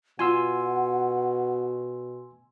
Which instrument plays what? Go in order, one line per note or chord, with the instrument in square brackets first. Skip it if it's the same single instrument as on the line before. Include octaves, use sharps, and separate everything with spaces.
[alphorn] B2 [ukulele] F4 [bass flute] F#5 [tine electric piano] G#5 C6 E6